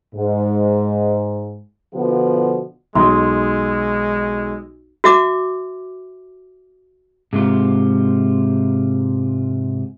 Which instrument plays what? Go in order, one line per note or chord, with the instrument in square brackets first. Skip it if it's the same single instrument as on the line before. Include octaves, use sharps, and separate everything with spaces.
[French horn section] G#2
B2 D3 F3 B3 F4 F#4
[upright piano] B1 D#6 [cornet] G#3 [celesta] C6
[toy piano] F#4 E5 D6
[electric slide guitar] G#2 C3 F4